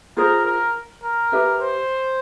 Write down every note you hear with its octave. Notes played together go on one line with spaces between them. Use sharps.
F4 G#4 A#4 C5
A#4
A#4
G4 B4 E5
C5